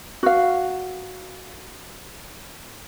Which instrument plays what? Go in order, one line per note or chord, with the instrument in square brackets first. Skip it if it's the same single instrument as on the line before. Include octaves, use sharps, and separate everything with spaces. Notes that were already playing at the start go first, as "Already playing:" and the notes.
[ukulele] F#4 F5